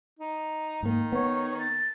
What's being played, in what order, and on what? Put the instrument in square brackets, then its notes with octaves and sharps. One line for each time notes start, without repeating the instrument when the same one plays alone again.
[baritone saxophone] D#4
[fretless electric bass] G#2 A#3 [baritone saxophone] D#3
[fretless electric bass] B3 [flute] C#5
[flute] A6